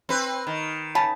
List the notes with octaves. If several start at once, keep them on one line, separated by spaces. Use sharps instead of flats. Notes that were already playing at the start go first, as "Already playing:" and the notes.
C4 B4
D#3
C#3 B4 A5